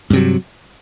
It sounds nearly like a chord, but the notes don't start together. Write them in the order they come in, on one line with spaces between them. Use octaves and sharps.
G2 C3 F#3